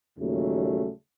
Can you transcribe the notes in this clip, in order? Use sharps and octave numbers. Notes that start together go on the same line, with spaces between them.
D#2 A#2 C#3 F#3 G3 A3